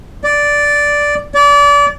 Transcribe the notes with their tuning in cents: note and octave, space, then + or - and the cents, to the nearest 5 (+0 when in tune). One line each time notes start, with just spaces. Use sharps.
D5 -5
D5 -30